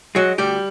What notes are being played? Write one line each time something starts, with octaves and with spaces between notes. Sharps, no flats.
F#3 G#3 F#4
D2 G3 G4